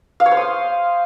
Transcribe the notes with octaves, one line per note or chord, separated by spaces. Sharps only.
F5
C#5
C5
D#6